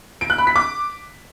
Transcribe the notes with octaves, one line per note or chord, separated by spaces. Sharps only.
D7
F#6
B5
B6
D6